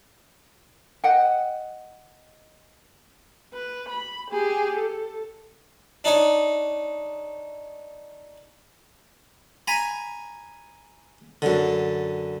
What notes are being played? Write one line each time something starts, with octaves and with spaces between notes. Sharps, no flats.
D#5 F#5 G5
B4
B5
G4 G#4
A4
D4 D#4 C#5
G#5 A#5 B5
F#2 D3